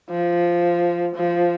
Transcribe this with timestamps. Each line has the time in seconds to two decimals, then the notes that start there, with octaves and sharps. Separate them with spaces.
0.10 F3
1.16 F3